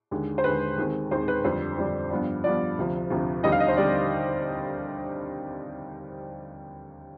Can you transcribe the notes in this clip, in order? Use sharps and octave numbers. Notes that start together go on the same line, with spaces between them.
D#2 D3 G#3
C5
D#2 D3 G#3 B4
D#2 D#3 G#3 C4
D#2 D#3 G#3 C4 C5
B4
F2 D3 G3 D4 C5
F2 D3 G3 D4
G2 F3 B3 D4
G2 F3 B3 D4 D5
D2 C3 F3
D2 C3 F3
D#2 D3 G3 C4 D#4 D#5
F5
D#5
C5
D3 G3 C4 D#4 D5